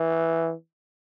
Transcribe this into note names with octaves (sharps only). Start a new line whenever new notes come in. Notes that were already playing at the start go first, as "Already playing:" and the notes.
Already playing: E3